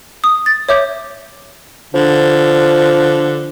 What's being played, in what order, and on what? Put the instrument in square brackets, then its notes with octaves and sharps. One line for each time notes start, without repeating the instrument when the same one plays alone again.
[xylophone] D#6
A6
C#5 E5 D6 G6
[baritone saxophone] D3 [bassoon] F3